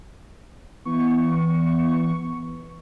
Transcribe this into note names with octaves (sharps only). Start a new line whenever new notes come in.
E3 B3 C#6